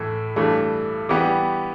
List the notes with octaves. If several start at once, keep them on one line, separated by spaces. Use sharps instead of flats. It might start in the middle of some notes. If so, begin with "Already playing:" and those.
Already playing: A2 E3 A3
G2 E3 A3
E3 G3 B3 G4